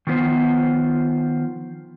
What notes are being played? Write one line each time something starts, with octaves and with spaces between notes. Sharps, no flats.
D#3 F3 B3 C5